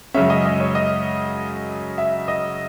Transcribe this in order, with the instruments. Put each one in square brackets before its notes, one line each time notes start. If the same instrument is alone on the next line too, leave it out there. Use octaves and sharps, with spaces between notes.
[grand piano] F#2 C#3 G#3 C#4 E5
D#5
D#5
C#5
D#5
E5
D#5